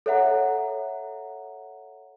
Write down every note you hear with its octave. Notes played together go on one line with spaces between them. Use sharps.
A4 C#5 E5 F#5 A#5